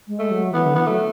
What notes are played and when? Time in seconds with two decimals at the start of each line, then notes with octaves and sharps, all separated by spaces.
0.08 G#3
0.19 A3
0.31 F#3
0.53 E3 B3
0.66 D3
0.75 E3 B3
0.87 F#3 A3